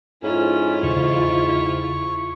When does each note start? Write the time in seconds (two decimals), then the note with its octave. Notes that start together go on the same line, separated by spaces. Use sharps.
0.23 F2 G#2 C#4 E4 F4
0.83 E2 C#3 C#6